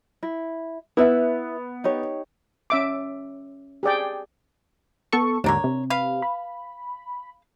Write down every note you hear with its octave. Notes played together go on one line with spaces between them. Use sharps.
E4
B3 E4 B4 E5
D#4 G4 C#5
C#4 E5 D6
G4 G#4 D5 G5
B3 A4 C#6
D#2 G#2 D3 D4 A#4 C#5
C3
B4 F5
B5